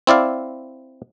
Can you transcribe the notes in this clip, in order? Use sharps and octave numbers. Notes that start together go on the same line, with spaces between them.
C4 E4 D5 F5